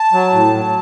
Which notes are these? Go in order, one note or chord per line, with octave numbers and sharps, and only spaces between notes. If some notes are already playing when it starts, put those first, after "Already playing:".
Already playing: A5
F#3
A2
F#3